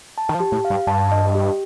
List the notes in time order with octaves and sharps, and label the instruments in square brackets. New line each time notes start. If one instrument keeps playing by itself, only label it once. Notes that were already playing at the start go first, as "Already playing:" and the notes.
[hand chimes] A5
[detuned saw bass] D#3
F3
[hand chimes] G4
[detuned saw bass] A2
[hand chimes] F5
[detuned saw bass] G2
[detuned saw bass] G2 [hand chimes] A5
[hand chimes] D#5
G4